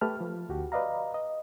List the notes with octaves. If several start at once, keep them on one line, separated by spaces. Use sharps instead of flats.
A3 G4 B4 A5 F6
F3
D2 F#4 G4
B4 D5 D#5 F5 A#5
D#5